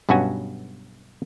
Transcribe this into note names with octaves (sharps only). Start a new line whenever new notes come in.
B1 G2 B3 C#4 F#4 G#5